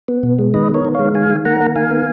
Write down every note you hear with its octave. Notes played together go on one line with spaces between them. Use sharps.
B3
B2
G#3
D#3 B4 D#5
B3
A#4 C#5
D#3
G#3 C#5 F5
D#3 F5 G#5
D#3
A#3 F#5 A#5
A#3
D#3 F5 G#5
B3